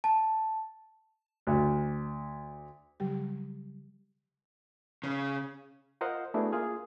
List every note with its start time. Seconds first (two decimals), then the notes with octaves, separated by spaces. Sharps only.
0.04 A5
1.47 D2
3.00 C#3 F#3 G3 G4
5.03 C#3
6.01 F4 A#4 C5 D#5 F5 F#5
6.34 A3 B3 D4 E4 F#4 G#4
6.52 A#3 F4 G#4 F5